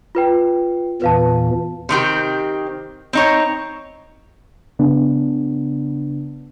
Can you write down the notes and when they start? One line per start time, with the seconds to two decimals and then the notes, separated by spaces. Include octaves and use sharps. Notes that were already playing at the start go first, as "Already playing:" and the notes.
0.15 F4 B4 G5
1.02 E2 A#2 E3 B4 F5 A5
1.89 C3 D#3 C4 G4
3.13 C4 D#4 C#5
4.79 C#3 B3 D4